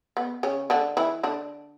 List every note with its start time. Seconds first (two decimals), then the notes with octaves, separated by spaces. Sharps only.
0.17 B3
0.43 C#3 C#4
0.70 D3 D4
0.97 E3 E4
1.23 D3 D4